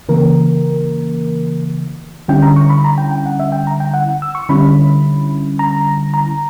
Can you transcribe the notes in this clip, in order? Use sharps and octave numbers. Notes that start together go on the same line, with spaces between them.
C#3 E3 A#3 A#4
D3 G3 C#4 E4 G5
A#5
C#6
B5
A#5
G5
G5
F#5
E5
G5
A#5
G5
F#5
E6
C#6
D3 G3 C#4 E4 B5
A#5
A#5